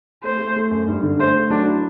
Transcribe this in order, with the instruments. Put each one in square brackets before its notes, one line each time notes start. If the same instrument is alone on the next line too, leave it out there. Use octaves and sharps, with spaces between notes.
[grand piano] A3 [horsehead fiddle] C5
[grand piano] A3
A3
F#2
G2
D3
[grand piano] A3 [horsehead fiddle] C5
[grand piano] A3
[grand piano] F#3 [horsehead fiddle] D4
[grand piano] E4